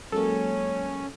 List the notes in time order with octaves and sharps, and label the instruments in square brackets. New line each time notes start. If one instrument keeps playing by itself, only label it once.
[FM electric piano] F#3 G#3 A#3 [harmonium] C#4 [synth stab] A4